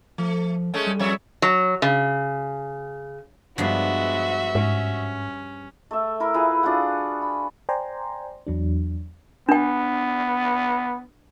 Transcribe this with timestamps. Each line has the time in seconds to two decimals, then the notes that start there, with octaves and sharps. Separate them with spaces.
0.18 F3 A3
0.74 G#3 A3 C#4
0.87 G3
0.99 F2 C#5 E5
1.42 F#3
1.82 C#3
3.58 G2 F3 G#3 B3 F#4 E5
4.55 G#2 C#4
5.91 A3 E5
6.20 E4 A#4 E5
6.34 E4 F4 G#4 B4
6.63 D4 F4 F#4 F#5
7.22 B5
7.69 C5 D5 G5 G#5 A#5 C6
8.47 E2 F#3 D4
9.49 B3 D4 G5